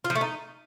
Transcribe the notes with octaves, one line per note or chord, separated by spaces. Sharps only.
F4
F3
A3
D#4